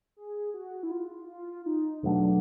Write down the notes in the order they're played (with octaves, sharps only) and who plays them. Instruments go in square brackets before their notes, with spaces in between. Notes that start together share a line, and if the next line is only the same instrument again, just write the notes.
[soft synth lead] G#4
F#4
E4
F4
F4
D#4
[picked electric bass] E2 B2 F#3 A3 [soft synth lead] D4